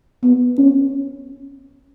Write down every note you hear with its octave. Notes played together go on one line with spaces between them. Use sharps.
B3
C#4